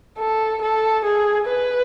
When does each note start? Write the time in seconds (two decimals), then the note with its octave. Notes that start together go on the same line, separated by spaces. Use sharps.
0.19 A4
0.62 A4
1.05 G#4
1.47 B4